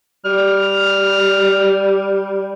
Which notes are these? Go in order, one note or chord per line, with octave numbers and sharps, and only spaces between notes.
G3 F6